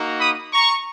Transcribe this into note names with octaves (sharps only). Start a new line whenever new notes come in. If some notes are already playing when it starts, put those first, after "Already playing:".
Already playing: A#3 D#4 F#4
B5 D#6
A#5 C#6